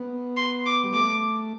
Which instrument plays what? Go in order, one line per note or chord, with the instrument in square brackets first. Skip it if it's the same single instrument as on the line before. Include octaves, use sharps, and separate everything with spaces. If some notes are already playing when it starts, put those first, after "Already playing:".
Already playing: [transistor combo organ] B3
[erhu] C6
D6
[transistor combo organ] G3
[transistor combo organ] A3 [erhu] D6